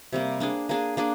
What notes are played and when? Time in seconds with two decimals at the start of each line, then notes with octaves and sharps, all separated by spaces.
0.13 C3 G3 A#3
0.40 A#3 D4 G#4
0.69 A#3 D4 G#4
0.97 A#3 D4 G#4